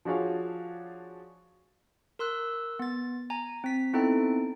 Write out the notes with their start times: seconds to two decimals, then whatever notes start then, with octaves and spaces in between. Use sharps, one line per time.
0.05 F3 D4 F#4 G#4 C#5 F5
2.19 A#4 C6 E6 F#6
2.79 B3 A6
3.30 G#5 A#5
3.64 C4 B6
3.93 B3 C4 D#4 E4 A4 G5